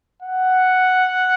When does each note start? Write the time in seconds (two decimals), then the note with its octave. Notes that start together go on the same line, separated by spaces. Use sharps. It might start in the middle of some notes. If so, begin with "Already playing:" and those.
0.23 F#5